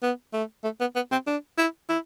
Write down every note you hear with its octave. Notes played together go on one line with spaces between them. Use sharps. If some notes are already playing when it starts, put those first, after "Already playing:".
B3
A3
A3
B3
B3
C4
D4
E4
E4